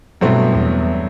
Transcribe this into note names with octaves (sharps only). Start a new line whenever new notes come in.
G2 B2 F#3 A3 C4 E4
E2